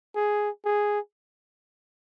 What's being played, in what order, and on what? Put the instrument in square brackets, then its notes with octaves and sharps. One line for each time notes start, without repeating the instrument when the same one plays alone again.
[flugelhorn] G#4
G#4